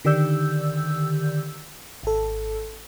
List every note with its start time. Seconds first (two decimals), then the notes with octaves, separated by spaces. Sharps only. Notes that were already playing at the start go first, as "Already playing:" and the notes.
0.05 D3 D#3 G4 D5 E6 G6
2.03 G#1 A4